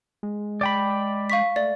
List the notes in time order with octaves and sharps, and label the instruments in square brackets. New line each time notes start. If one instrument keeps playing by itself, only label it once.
[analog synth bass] G#3
[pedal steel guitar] D5 G5 B5
[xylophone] F5 C#6 B6
[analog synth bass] A3 [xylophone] D5